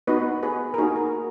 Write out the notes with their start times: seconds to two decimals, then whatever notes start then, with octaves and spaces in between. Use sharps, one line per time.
0.07 B3 D#4 F#4 B4 D#5
0.43 G#4 B4
0.74 A#4
0.78 A#3 D#4 F#4 G#4
0.96 A#4